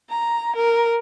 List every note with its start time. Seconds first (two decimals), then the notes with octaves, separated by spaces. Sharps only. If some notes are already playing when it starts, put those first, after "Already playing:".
0.10 A#5
0.56 A#4